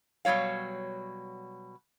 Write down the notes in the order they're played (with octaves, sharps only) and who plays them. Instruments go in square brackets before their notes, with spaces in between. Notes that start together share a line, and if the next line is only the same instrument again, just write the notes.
[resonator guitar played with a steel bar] B2 F#3 G3 C#5 F5